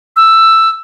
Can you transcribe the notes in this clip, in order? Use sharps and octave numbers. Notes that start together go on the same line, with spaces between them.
E6